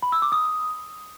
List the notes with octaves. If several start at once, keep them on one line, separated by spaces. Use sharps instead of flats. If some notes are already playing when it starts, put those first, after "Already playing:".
B5
E6
D6
D#6